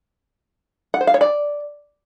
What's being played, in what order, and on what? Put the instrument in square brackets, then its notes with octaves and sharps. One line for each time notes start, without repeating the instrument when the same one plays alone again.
[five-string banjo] F#5
C5
F5
C#5
D5